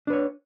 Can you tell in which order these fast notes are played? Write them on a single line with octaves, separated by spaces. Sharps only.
D4 B4 C#5